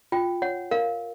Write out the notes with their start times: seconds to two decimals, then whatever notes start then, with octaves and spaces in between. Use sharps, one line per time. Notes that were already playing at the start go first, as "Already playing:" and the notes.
0.12 F4 G5
0.42 C#5 F#5
0.71 A#4 F5